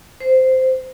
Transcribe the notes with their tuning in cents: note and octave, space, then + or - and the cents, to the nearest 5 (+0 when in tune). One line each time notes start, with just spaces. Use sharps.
C5 -10